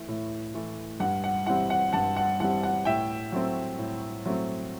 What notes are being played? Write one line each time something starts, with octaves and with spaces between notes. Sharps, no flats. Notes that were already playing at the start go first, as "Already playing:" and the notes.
Already playing: E3 A3
A2
E3 A3
G2 F#5
F#5
E3 G3 C4 F#5
F#5
G2 F#5 A5
F#5
E3 G3 C4 F#5
F#5
A2 E5 G5
F#3 A3 C4
A2
F#3 A3 C4